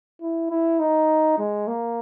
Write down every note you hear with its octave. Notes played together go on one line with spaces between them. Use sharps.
E4
E4
D#4
G#3
A#3